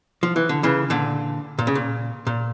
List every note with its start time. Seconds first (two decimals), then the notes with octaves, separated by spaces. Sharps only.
0.23 F3
0.36 E3
0.49 D3
0.63 C#3 E3
0.90 A#2 D3
1.59 A#2
1.67 C#3
1.75 A#2
2.27 A#2